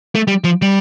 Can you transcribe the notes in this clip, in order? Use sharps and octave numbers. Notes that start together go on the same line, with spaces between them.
A3
G3
F3
G3